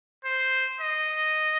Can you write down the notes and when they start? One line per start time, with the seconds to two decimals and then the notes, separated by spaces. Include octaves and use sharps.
0.25 C5
0.81 D#5